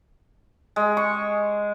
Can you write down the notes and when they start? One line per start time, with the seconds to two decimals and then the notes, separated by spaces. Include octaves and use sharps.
0.76 G#3
0.97 C#6